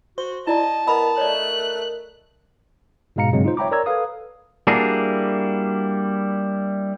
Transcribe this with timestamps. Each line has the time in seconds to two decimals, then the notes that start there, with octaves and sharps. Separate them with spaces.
0.18 F#4 C5
0.47 E4 D5 D#5 A5 A#5
0.88 B3 A#4 D#5 B5
1.18 A3 C#5 D5 F#6
3.16 G#2 B2 G#3 F5 A#5 C#7
3.32 G2 C#3 F#3 G#3 C4
3.44 D#4 F4 C5
3.57 C#5 E5 G5 A#5 B5 D6
3.71 A#4 C#5 D5 A#5 E6 G#6
3.86 A4 B4 F5 D#6
4.67 G3 A#3 D4 E4 F#4 G#4